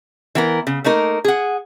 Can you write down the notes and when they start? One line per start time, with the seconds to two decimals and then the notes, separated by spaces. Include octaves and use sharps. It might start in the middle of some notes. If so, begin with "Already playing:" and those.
0.35 E3 B3 A#4
0.67 C#3
0.84 A3 A#3 D#4 A#4
1.24 G#4 F#5